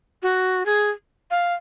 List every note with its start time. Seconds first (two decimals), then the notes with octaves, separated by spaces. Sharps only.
0.23 F#4
0.66 G#4
1.31 F5